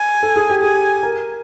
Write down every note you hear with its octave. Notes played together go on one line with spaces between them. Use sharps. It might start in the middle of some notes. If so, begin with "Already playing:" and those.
Already playing: G#5
A4
G#4
G4
G#4 G#5
A#4